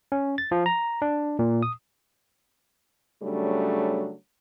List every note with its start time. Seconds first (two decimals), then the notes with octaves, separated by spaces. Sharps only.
0.12 C#4
0.38 A6
0.51 F3
0.66 A#5
1.02 D4
1.39 A#2
1.63 D#6
3.23 C#3 F#3 G3 A3 D4